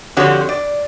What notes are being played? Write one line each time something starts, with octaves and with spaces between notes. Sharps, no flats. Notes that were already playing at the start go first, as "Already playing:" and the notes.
D3 F3 C4 F#4 G4 C#5
D5